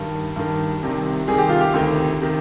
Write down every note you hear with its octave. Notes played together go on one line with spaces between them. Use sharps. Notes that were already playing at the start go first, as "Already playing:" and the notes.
Already playing: G2 D#3
G2 D#3
C2 C3 D#3
C2 C3 D#3 G#4
G4
F4
G4
D2 C3 D#3
C3 D#3